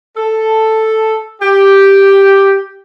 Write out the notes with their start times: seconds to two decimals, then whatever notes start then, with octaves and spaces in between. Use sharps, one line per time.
0.17 A4
1.42 G4